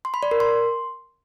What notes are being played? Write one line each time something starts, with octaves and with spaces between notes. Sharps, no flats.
C6
B5
D5
A#4
C6